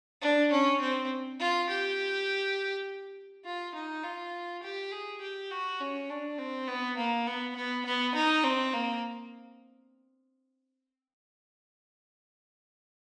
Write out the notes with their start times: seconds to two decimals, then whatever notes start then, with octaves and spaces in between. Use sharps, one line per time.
0.22 D4
0.51 C#4
0.81 C4
1.40 F4
1.69 G4
3.45 F4
3.75 D#4
4.04 F4
4.63 G4
4.92 G#4
5.21 G4
5.51 F#4
5.81 C#4
6.10 D4
6.38 C4
6.67 B3
6.97 A#3
7.27 B3
7.56 B3
7.86 B3
8.15 D#4
8.44 C4
8.73 A#3